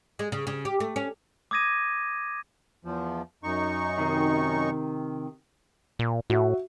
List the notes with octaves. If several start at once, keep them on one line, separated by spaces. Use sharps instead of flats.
G#3
C#3
C#3
G4
A3
C#4
D6 D#6 G#6 A#6 D#7
E2 F3
F#2 D#4 C#6
C3 D#3
A#2
A2 F#4 E5